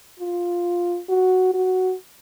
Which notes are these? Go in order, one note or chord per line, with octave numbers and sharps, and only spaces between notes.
F4
F#4
F#4